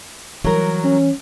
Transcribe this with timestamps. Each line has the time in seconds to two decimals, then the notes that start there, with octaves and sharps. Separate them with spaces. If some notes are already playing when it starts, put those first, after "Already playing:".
0.44 E3 F#3 G3 A#4
0.84 C#4